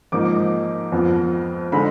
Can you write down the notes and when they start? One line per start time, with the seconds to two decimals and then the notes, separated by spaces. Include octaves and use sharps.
0.12 G#2 F3 A#3 D#4 D6
0.92 F2 F3 B3 F4
1.72 D3 G#3 D#4 B5